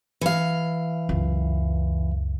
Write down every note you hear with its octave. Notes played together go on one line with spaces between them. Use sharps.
E3 F5
C#2 F#2